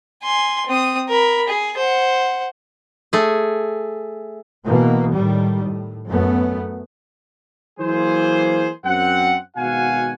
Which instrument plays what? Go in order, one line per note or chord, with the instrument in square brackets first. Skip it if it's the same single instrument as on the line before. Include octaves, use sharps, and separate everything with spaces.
[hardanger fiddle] G#5 C6
C4 D#6
A#4 B5
G#4
C5 F#5
[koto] A3 G#4
[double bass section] B2 E3 A#3
A2 D#3 G3
A2
F#2 A3 B3
[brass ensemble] E3 F#3 A#3 G#4 C5
F#2 C4 F#5
G#1 B2 F#4 F5 F#5 G#5